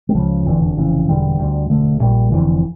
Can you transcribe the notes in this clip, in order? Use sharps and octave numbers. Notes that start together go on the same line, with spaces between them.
G3
C#2 C#3 F3
F1 E2 D3 E3
D3
F1 F2 C#3 E3
E1 E2 D3 G3
D2 D3
E1 D2 D3 A3
A#1 A#2 G3
F1 F2 D3 E3